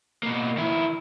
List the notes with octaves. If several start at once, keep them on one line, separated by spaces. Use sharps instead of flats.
B2 A#3
D#3 E4